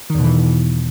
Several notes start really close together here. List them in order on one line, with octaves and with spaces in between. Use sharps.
D#3 E2 B2 E3